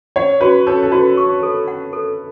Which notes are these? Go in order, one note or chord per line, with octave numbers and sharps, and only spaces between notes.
C#5 F#5
F#4 B4
A4 C#5
A4
F#4 B4
C#6
A4
F#5
A4